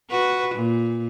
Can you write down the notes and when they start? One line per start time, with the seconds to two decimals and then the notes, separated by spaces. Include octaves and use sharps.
0.10 F#4 B4
0.55 A#2